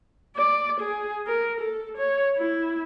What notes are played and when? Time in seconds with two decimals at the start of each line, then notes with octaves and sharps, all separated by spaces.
0.37 D5
0.80 G#4
1.27 A#4
1.60 A4
1.98 C#5
2.37 E4